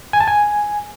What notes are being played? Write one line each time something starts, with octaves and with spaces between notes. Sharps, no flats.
G#5
A5
G#5